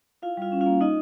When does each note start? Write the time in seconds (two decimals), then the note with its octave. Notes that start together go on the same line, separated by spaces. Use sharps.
0.22 E4 F4 F5
0.37 G3 F4 F5
0.52 C#4
0.61 F4 F5
0.66 A#3
0.81 D#4 F4 D#5